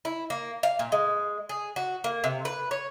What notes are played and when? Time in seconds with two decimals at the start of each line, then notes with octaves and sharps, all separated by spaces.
0.05 E4
0.30 A#3
0.63 F5
0.79 A#2
0.92 G#3
1.49 G#4
1.76 F#4
2.04 A#3
2.24 C3
2.45 B4
2.71 C#5